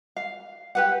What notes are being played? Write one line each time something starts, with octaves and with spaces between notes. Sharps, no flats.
F5
G4 B4 F#5